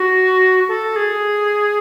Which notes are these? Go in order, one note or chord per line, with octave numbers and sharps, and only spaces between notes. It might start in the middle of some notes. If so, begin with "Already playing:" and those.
Already playing: F#4
A4
G#4